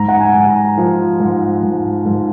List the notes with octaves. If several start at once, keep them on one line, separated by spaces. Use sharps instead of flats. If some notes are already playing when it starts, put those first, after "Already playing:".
Already playing: G#2 A#5
F#5
G#5
G#2
A#5
F3
G#2
G#2
G#2